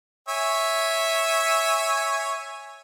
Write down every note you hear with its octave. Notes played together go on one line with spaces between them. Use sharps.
C#5 E5 G#5